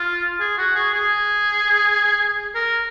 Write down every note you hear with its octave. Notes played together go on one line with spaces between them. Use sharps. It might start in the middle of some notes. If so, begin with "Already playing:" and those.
Already playing: F4
G#4
F#4
G#4
G#4
A#4